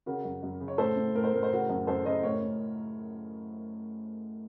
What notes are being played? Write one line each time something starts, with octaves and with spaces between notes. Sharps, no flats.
C#3 F#4 A#4
F#2
F#2
C#3
C#5
A2 A4 C5
A2
A2 A#4
C5
A2 A#4
C5
C#3 F#4 A#4
F#2
F#2 A4 C5
C#3 C5 D#5
A2 A#4 C#5
A2